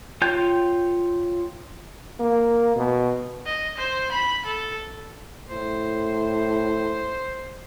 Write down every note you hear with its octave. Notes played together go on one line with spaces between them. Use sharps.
F4 C#5 G5 G6
A#3
B2
D#5
C5
B5
A4
A2 C5